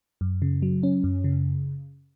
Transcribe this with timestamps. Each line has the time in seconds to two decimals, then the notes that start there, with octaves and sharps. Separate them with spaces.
0.21 F#2
0.42 C#3
0.62 F#3
0.83 C#4
1.04 F#2
1.24 C#3